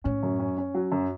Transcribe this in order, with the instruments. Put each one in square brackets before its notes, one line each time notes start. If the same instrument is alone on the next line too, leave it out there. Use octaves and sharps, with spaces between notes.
[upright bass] A2 [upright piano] C#4
[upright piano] F#2
C#4
C#4
F#3
F#2